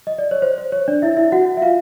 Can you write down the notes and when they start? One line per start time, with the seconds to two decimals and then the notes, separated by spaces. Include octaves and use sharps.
0.07 D#5
0.18 D5
0.31 C#5
0.42 C5
0.58 C5
0.72 C#5
0.88 D4 D5
1.02 E4 E5
1.17 E4 E5
1.32 F#4 F#5
1.57 E5
1.62 F4 F5